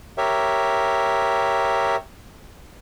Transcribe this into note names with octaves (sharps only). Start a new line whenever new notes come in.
G4 A#4 C#5 E5